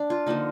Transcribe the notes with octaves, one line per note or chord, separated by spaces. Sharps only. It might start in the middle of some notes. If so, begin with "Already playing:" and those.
Already playing: D4
F4
D3 F3 A#3 D#4